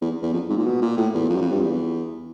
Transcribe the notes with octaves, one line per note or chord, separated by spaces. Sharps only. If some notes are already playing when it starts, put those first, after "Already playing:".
E2
E2
F2
G#2
A#2
B2
A#2
A2
E2
F2
F#2
F2
G2
E2